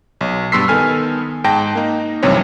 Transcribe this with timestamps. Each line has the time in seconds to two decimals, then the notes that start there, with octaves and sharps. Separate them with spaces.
0.21 B1
0.52 G2 B3 C6 E6 B6 C7
0.68 D#3 B3 A4 G#5 F6
1.44 G#2 G5 A5 A#6
1.75 A#3 D#4
2.23 B1 F#2 C3 E3 G3 C#5